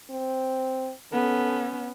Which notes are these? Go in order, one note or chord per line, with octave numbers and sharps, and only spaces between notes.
C4
B3 C#4 A4